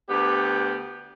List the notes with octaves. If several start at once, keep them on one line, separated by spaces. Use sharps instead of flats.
D2 B3 G4